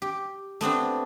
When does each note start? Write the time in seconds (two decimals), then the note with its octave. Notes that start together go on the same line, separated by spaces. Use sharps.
0.02 G4
0.61 A3 B3 C4 D4